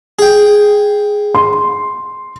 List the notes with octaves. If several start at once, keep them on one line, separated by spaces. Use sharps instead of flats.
G#4 G5
C6